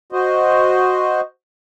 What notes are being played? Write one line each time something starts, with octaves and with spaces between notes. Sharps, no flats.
F#4 C5 D#5